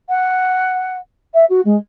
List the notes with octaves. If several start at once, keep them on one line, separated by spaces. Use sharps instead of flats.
F#5
E5
F#4
G#3